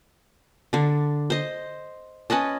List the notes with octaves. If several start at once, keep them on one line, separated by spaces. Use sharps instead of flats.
D3 D4
C5 D#5
C#4 B4 D#5 A5